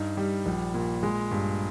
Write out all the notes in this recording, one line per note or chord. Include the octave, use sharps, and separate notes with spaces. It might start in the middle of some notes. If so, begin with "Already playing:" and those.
Already playing: G2 D#4
G3
A#1
A#2
G#3
G2